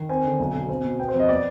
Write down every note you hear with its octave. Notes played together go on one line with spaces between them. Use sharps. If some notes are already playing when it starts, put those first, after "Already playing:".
Already playing: D#3
C4 G#5
D3
B1
B2
C4
B2
B3 G5
C5
F2
D#5
B3 D5